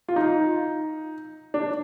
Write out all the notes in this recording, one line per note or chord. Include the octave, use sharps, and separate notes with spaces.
F4
D#4
D4